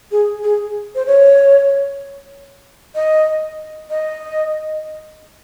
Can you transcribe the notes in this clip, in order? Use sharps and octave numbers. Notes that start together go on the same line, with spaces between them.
G#4
G#4
C5
C#5
D#5
D#5